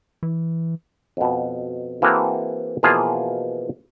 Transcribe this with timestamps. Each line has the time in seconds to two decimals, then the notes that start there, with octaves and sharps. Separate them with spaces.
0.23 E3
1.17 F2 B2
2.02 E3 A#3 C4 F#4 G#4 A4
2.83 B2 E3 F3 A#3 F4 G#4